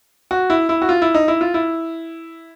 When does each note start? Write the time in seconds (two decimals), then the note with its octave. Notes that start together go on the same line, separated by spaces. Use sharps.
0.31 F#4
0.50 E4
0.69 E4
0.82 F#4
0.89 F4
1.02 E4
1.14 D#4
1.28 E4
1.41 F4
1.54 E4